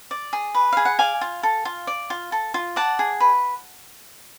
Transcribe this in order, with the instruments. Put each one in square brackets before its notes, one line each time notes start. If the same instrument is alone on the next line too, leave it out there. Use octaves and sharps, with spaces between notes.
[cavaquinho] D5
G#4
B4
G#4 F5
F#5
D5 F5 G#5
F4
A4
F4
D5
F4
A4
F4
D5 F#5 A5
G#4
B4